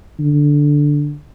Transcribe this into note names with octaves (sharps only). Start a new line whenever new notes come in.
D3